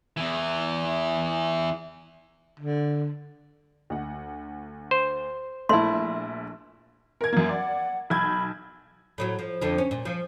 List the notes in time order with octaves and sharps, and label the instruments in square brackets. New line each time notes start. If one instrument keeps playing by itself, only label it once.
[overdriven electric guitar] E2 E3
[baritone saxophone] D3
[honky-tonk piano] D2 F#5
[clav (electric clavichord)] C5
[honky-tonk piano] A#1 [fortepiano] A3 E4 [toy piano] C6
[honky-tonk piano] A#4 G#6
F#2 A#3
[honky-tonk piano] D5 [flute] F#5
[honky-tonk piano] B1 G6 G#6 [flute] B5
[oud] A2 F3 F#3
F3
F2 D3 F3
C#4
A#2
F3